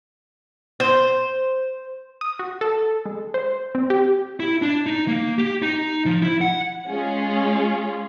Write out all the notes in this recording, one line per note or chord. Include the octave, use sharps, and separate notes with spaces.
C5
D#6
F#4
A4
G#3
C5
C4
G4
E4
D4
D#4
A#3
G4
D#4
F3
E4
F#5
G#3 C#4 F4 G#4